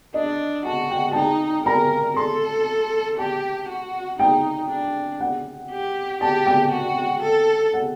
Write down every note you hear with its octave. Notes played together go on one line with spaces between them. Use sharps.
D4 D#5
F#4 A5
G5
A5
D#4 G5
A#4 A#5
A4 C6
G4 A5
F#4
D#4 G5
D4
F#5
G4
G4 A5
G5
F#4
A4
F#5